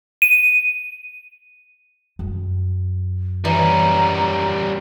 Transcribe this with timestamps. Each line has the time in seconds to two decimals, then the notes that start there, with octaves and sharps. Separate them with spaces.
0.22 D#7
2.19 F#2
3.45 E3 G3 C#4 A#5